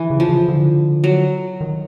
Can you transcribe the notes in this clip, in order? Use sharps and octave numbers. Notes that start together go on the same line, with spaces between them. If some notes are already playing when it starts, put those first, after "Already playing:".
Already playing: E3
C#3
F3
C#3
D3
F#3
D#3